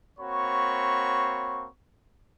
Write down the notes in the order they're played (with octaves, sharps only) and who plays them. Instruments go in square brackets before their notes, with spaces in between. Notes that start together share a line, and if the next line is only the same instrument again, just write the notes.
[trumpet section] A#3 C4 F#4 C#5 B5 C#6